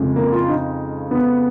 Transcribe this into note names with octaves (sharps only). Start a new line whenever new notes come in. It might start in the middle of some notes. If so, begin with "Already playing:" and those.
Already playing: F2 C#3 F3 G#3
A#3
F4
D#4
B3